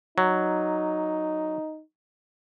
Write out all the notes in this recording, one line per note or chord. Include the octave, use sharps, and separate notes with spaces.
F#3 D#4